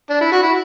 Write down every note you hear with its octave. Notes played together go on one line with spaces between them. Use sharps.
D4
E4
F#4
E4